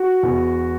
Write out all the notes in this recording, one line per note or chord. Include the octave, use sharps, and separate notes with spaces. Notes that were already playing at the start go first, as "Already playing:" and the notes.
Already playing: F#4
E2